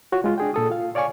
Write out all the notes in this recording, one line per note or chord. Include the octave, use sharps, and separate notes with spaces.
F4 F#4 C#5
G#3 F4
D4 G#4 G5
A#2 A4 D#6
F4 F5
C#5 D5 F5 G#5 C#6